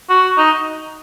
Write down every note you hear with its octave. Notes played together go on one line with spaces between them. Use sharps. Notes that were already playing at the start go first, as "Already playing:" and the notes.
F#4
D#4